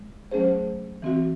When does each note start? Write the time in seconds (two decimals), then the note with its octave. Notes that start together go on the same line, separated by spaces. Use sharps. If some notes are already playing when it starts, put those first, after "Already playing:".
Already playing: G#3
0.31 F#3 A3 C#4 G#4 C5
1.02 E3 C4 F#4